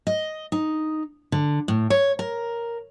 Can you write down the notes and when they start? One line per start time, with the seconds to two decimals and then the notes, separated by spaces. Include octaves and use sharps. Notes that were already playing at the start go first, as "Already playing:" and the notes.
0.07 D#5
0.52 D#4
1.32 D3
1.68 A2
1.90 C#5
2.19 A#4